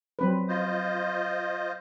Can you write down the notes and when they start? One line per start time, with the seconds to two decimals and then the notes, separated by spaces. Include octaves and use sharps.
0.19 F#3 C4 B4
0.48 F4 C5 D#5